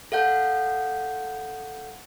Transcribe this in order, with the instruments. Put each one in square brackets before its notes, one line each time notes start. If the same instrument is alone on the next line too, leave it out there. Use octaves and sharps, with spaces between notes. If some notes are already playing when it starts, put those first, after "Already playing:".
[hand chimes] A4 F5 F#5 G6